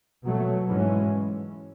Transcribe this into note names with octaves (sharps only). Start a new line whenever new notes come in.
B2 F#3 A3
G#2 E3 G#3 C#4